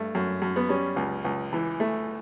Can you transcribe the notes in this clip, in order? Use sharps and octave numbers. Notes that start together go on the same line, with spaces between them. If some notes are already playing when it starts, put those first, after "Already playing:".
Already playing: G2 A3
F#2
F#2
B3
G3 C#4
C#2
C#2
E3
A3